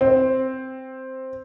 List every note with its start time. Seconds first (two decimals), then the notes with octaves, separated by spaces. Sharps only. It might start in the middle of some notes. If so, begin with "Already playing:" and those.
0.01 C4